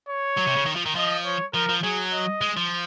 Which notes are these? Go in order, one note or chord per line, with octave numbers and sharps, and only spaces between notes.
C#5
F#3
C3
C#3
D#3
F3
D#3
F3 D#5
C#5
F3 A#4
F3
F#3 G#4
D#5
G#3
F3